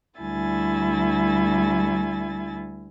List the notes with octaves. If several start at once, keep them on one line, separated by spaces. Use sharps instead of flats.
D2 G3 E4 G#5 A6